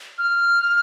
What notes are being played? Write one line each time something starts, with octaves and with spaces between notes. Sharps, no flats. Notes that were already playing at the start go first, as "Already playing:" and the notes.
F6